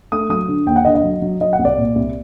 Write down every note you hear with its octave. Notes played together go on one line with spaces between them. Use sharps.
A3 D#6
F#3 D#6
D3
D#2 G5
F#5
D3 D#5
D#5
F#3
F#3
F#3 D#5
F#5
C2
D5
A#2
C2